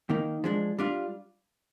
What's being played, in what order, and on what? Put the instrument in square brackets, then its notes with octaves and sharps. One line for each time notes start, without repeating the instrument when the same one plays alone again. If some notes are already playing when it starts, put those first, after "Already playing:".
[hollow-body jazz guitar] D#3 A#3 D#4
F3 G#3 D4
G3 D4 F4